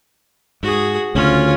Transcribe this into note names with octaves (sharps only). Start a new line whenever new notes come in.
G#2 F#4 G#4
D2 C#3 C#4 F4